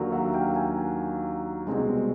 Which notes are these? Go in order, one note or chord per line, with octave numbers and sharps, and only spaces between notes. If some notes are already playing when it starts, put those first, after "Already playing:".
Already playing: D#2 D3 F#3 A#3
E5 F#5
F5 G5
F#5 G#5
C2 B2 G#3 C4